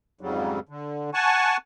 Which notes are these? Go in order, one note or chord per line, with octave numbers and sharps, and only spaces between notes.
F2 G#2 C#3 F#3 G3
D3
F#5 G#5 A5 C#6